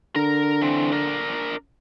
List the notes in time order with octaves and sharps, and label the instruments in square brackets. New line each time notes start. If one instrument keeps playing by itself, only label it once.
[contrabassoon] D3 [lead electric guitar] A#4 A#5
[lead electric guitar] E3 C4
D4 A#4